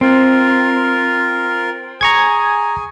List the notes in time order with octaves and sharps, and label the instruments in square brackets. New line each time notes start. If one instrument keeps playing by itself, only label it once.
[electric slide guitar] C4 [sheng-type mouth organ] F4 A#4
[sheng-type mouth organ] G#4 G#5 [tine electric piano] A#5 C#6 G#6